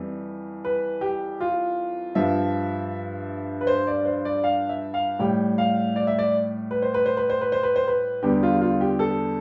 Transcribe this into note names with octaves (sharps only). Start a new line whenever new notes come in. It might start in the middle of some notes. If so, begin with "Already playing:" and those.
Already playing: F2 E3 G3
B4
G4
F4
G2 F3 E5
B4
C5
D5
C5
D5
F5
E5
F5
A2 G3 G5
F5
D5
E5
D5
B4
C5
B4
C5
B4
C5
B4
C5
B4
C5
B4
E2 D3 G3 G4
F4
F4
G4
A4